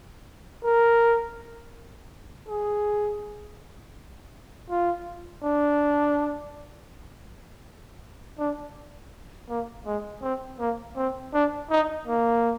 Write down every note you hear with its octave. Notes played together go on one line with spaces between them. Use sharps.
A#4
G#4
F4
D4
D4
A#3
G#3
C4
A#3
C4
D4
D#4
A#3